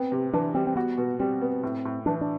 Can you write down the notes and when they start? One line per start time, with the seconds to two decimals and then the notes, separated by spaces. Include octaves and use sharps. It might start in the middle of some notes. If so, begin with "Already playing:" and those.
Already playing: B3 C4
0.12 C3
0.33 E3 D4
0.55 G3 C4
0.67 C4
0.76 B3 F#4
0.98 B2
1.19 G3 C4
1.41 B3
1.63 A2
1.85 A2
2.06 E3 D4
2.21 D4